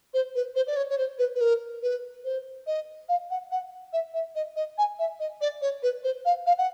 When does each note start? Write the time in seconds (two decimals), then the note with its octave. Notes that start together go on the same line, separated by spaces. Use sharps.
0.14 C5
0.35 B4
0.55 C5
0.67 D5
0.76 C#5
0.89 C#5
0.98 C5
1.18 B4
1.35 B4
1.41 A#4
1.82 B4
2.24 C5
2.67 D#5
3.09 F5
3.30 F#5
3.51 F#5
3.93 E5
4.14 E5
4.35 D#5
4.56 D#5
4.78 G#5
4.99 E5
5.19 D#5
5.41 D5
5.61 C#5
5.83 B4
6.03 C5
6.25 F5
6.46 F5
6.58 F#5